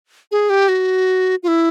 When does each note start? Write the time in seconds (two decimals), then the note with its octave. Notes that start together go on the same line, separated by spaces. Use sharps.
0.32 G#4
0.50 G4
0.68 F#4
1.43 F4
1.48 E4